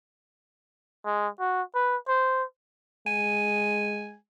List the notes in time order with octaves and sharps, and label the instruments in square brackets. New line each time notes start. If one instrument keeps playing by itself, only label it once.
[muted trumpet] G#3
F#4
B4
C5
[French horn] G#3 [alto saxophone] G#5